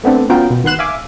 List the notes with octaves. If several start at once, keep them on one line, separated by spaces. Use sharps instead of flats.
A3 B3 C4 D4 A4
B3 C#4 F4 F#4 A#4 G5
B2
D#3 B3 C6 F#6 E7
E5 F5 G#5 D6